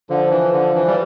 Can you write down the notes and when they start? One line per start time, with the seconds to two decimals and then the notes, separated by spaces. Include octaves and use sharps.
0.10 D3 F3
0.31 E3
0.53 D3
0.75 E3
0.87 G3